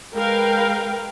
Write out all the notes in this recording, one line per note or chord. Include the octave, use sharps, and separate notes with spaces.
G#3 A#4 B4 F5 G5